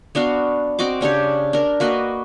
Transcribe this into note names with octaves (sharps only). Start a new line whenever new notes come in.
B3 D4 F#4 F5
C4 F#4 D#5 D6
C#3 D4 G4 C#5
D4 A#4
A#3 F#4 B4 D#5